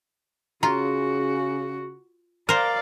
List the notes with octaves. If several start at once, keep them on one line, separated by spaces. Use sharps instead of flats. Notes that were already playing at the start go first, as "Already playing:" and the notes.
C#3 F4 F#4 A#5
A#4 C5 D5 F5 F6